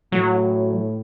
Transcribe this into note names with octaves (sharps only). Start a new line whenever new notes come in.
A2 F#3